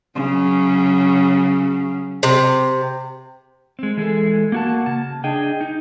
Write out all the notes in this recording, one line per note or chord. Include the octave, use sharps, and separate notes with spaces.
C#3 F#3
C3
G#3 C4
E3 G#3 G#4 A4
A#3 F#4 A5
C#3 A5
D4 G#4 D#5 G5
D#4